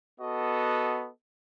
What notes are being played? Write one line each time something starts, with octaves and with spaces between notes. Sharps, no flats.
B3 F#4 A4 D#5